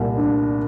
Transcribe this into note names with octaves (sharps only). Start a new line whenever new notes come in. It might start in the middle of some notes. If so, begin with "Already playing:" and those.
Already playing: C2 A#2
D4